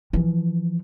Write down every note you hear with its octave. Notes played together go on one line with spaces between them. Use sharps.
E3 F3